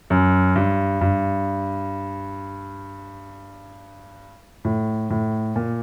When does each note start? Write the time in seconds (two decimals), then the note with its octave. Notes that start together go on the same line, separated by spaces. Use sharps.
0.10 F#2
0.56 G2
1.01 G2
4.65 A2
5.10 A2
5.56 A#2